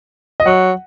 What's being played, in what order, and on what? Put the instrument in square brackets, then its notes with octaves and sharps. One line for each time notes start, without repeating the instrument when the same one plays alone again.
[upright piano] D#5
[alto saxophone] F#3 [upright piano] F#5